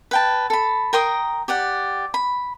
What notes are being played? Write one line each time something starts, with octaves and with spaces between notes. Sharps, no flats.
B4 G5 A5
A4 B5
A#4 G5 C6 D#6
G4 D5 F#5
B5